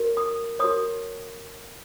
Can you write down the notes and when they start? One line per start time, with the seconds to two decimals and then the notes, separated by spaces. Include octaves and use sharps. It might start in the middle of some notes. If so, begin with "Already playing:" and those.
Already playing: F#4 A#4 C#5
0.17 D#6
0.59 F#4 A#4 C#5 D#6